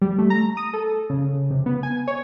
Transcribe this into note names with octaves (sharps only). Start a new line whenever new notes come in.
G3
A3
A#5
D#6
A4
C#3
C3
B3
G#5
C#5